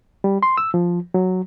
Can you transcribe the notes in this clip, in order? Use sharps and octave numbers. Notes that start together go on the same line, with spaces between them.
G3
C6
E6
F3
F#3